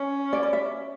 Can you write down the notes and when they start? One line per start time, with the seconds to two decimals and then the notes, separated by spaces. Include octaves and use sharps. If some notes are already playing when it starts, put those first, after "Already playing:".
Already playing: C#4
0.33 D5
0.43 D5
0.53 E5